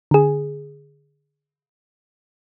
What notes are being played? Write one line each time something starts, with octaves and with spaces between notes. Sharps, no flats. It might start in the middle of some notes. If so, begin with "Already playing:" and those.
D3 G#4